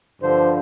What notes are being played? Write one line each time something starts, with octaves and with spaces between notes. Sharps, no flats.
G2 D3 F3 C5